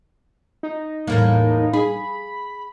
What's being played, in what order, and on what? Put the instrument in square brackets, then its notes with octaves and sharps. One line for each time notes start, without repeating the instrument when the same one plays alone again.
[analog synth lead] D#4
[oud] E2 A2 A#3
[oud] G#4 [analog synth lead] B5